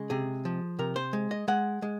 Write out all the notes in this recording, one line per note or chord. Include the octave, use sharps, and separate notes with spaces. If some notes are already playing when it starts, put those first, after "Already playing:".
Already playing: C#3 G#3
C3 G#4
F3
C3 A#4
C5
G#3
D#5
G#3 F#5
G#3